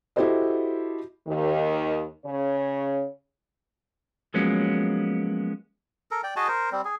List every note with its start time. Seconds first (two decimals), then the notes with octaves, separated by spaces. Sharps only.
0.16 E4 F#4 G4 A4 C5 D#5
1.27 D#2 D#3
2.25 C#3 C#5
4.34 F3 F#3 G#3 A#3 B3 C#4
6.11 A4 A#4
6.23 D5 G5
6.36 F#4 G#4 D#5 A5
6.48 A#4 C5
6.72 G3 C4
6.85 G#4